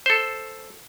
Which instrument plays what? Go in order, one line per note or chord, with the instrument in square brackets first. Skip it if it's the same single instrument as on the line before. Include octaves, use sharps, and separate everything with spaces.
[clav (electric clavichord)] A4 C5